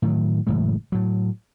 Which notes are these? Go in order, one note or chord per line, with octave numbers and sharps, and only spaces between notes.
A2 D#3 F#3
F#1 A2 E3 G#3
A2 F#3